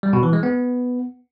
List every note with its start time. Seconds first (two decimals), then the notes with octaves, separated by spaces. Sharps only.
0.03 G3
0.13 B2
0.23 E3
0.33 G#3
0.43 B3